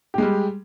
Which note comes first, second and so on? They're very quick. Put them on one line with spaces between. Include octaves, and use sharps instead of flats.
G4 G#3 G3